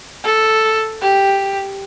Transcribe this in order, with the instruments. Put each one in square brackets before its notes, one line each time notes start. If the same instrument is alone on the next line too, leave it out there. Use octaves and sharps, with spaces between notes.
[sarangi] A4
G4